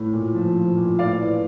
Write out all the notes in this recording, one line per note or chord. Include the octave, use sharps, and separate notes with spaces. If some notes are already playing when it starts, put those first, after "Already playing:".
Already playing: A2
A#2
F3
F3
A#2
A2 D5 F5
E3